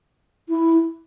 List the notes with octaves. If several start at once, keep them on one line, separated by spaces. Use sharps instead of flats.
E4